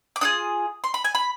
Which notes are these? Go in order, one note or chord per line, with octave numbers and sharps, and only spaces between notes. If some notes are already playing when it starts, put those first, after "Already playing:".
D6
D4 F4 G#4 D#6
C6
B5
G#5
B5